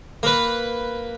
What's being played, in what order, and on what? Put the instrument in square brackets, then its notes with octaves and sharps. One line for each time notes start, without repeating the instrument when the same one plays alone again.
[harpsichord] A#3 B4